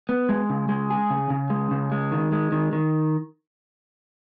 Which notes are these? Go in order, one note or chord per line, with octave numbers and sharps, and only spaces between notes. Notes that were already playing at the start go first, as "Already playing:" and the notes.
B3
G#3
C#3
G#3
G#4
C#3
C#3
G#3
C#3
G#3
D#3
G#3
D#3
D#3